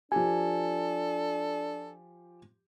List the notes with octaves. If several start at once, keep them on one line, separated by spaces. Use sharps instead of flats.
F3 D4 G4 A4 G#5